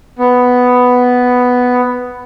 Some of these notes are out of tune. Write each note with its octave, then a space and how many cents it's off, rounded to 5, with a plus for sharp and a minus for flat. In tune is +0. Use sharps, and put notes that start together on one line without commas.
B3 +5